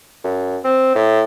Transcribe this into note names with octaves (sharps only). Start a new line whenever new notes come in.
F#2
C4
A2